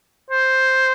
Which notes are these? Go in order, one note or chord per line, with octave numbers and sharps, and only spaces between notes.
C5